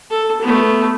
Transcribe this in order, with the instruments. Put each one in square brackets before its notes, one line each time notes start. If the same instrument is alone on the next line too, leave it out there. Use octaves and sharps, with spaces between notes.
[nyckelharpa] A4
A3 B3